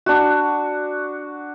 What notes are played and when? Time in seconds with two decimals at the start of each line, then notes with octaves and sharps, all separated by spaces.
0.06 D4 F#4